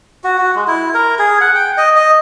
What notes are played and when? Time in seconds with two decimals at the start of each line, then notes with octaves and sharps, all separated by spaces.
0.24 F#4
0.38 F#4
0.55 G#3
0.67 E4
0.94 A#4
1.19 G#4
1.41 F#5
1.55 G5
1.77 D#5
1.96 D#5